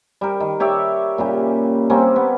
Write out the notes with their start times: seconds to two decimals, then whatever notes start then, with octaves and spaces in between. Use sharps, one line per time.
0.21 G3 A#4
0.40 D#3
0.60 G4 C#5 D5 E5
1.18 A#2 C#3 G3
1.90 G3 A#3 C4 C#4
2.16 B3